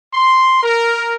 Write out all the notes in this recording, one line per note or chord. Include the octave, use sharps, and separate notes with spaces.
C6
A#4